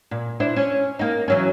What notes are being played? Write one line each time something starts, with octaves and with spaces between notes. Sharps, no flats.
A#2
D4 E4 C5
C#4
A#3 D#4
E3 F#3 C#4